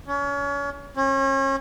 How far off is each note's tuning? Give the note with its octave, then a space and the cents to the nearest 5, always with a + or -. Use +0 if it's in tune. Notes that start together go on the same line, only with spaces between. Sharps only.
C#4 +30
C#4 -35